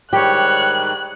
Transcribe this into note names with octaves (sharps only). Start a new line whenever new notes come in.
G#2 D#3 G3 G4 C#5 F#6